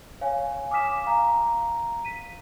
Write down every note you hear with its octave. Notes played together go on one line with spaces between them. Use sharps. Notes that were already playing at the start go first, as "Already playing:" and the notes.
C#5 F5 G#5
G#5 D6 D#6 F6 B6 E7
F5 A#5
B6 D#7